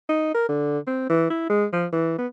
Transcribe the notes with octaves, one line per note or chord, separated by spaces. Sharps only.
D#4
A#4
D3
C4
E3
E4
G#3
F3
E3
B3